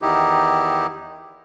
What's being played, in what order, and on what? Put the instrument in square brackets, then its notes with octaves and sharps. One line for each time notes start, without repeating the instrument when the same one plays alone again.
[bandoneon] E2 D#3 D#4 E4 G4